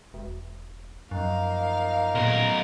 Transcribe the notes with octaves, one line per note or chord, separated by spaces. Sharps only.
E1
F#2 F3 A#3 D#4 F5
B1 A#2 A#4